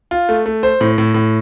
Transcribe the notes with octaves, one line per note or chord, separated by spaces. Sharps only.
F4
A3
A3
C5
A2
A2
A2